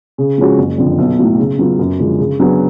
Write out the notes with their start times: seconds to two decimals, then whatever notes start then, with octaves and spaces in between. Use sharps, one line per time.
0.18 C#3
0.38 F3 G#3 C#4 F#4
0.58 F#1
0.78 F2 D3
0.98 B1
1.19 A2 F#3
1.38 C#3
1.59 F#3 B3 F4 B4
1.79 F#2
2.00 D3 F3 G#3 D4
2.20 C#3
2.39 F#3 B3 D4 G#4